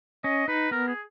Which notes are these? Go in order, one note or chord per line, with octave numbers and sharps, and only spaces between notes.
C#4 D#5
D#4 B4
B3 A#4
G#4